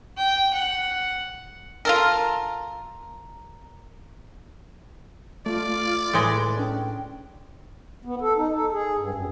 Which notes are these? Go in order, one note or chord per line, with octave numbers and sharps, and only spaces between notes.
G5
F#5
F4 A4 A#4
A3 F4 D5
A2 G#3 B4
C#4 D4 G5
B3
A4
D#4
A4
G#4
G2
F#2